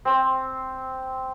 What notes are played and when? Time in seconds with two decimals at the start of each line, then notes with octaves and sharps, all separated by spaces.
0.05 C4